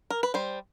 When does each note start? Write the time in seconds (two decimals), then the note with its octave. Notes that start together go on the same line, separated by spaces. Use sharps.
0.10 A#4
0.23 B4
0.34 G3 C5